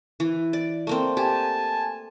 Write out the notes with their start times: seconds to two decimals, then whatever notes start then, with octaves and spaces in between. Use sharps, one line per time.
0.20 E3
0.53 D5
0.87 A3 A#3 C4
1.17 G4 G#5 A5